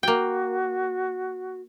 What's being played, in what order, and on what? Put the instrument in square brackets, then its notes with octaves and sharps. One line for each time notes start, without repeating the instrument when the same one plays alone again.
[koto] A#3 G5 [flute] F#4